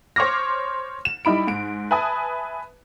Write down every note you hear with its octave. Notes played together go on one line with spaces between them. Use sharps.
C5 C#5 C6 D6 F6 A#6
E7
G3 D#4 E4 B5 D7
G#2 D7
B4 E5 G#5 A5 D#6